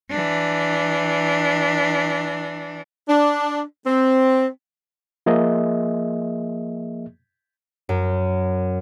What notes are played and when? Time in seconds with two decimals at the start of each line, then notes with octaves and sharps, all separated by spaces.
0.10 E3 D4
3.09 D4
3.87 C4
5.26 F3 A#3 G#4 D#5 E5
7.89 F#2